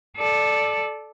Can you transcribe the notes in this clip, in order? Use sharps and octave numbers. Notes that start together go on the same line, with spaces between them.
A4 D5